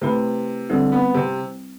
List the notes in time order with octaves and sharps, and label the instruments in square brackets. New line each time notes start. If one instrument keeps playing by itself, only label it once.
[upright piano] C3 [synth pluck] A3 E4 B4
[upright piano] D3 [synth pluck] G3 C4 E4
[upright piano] B3
C3